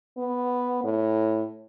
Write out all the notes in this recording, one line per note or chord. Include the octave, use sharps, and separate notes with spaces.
B3
A2